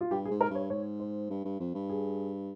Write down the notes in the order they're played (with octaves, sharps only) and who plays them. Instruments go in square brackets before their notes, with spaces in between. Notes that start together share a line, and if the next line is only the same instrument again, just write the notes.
[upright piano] F4
[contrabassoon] G2 [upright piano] G4
[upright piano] G#4
[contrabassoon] G#2
[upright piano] A#4
[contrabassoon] G2 [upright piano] C#5
[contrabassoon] G#2 [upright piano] C#5
[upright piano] C5
[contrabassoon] G2
G2
F2
G2
[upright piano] G#4